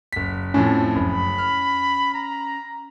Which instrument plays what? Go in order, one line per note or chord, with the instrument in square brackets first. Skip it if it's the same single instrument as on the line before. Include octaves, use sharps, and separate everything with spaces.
[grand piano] F#1 B6
[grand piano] F2 A2 [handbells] C#4
[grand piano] F#1 [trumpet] B5
[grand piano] F6
[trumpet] A#5